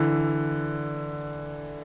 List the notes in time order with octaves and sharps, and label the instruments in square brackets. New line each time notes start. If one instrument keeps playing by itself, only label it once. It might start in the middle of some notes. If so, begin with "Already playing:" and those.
Already playing: [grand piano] D3 E3